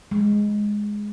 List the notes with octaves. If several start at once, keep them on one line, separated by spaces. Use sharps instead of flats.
G#3